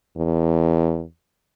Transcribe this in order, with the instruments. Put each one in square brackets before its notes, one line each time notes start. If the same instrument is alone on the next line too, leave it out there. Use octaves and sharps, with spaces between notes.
[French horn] E2